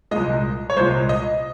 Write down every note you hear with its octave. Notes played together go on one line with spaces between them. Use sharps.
C2 A#2 G#3 D#5
C#5
C2 A#2 G#3 C5
D#5